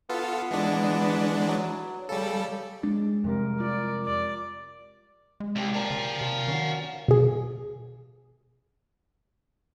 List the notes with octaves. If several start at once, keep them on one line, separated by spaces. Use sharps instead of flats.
B3 F4 A4
E3 G#3 D4
F#3
C#3 G3 A4
G#3 D4
F2 C3 G3 A#4
F4 D5
D5
G#3
C2 G4 A4
A#2 A#4 F5 A5
C#3
C3
D#3 C#4 F#4
B2 G#4